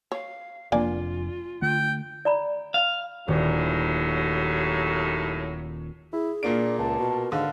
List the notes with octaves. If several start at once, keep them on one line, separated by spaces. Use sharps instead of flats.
C#5 F5
F1 F2 A#3 D4 F4 D5 G#5
D3 A3 G5
D5 A#5 B5
F5
D#1 D#2 A2 F#3
E4 G#4
A#2 A#3 D4 D7
C#2 A5
B2 A#4
G#2 D3 F5